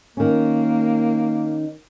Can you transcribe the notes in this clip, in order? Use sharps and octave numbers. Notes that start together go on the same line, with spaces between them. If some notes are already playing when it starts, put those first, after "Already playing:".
D#3 A#3 C#4